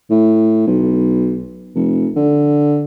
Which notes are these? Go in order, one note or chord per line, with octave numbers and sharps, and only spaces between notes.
A2
B1
F1
D3